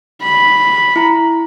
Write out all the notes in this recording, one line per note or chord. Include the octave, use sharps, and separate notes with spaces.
B5
E4 A#5